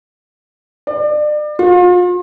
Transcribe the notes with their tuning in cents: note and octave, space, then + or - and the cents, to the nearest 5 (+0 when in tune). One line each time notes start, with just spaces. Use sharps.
D5 +35
F4 +40